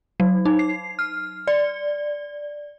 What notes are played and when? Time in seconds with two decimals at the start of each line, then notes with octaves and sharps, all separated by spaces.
0.20 F#3
0.45 D#4
0.59 C7
0.99 F6
1.47 D5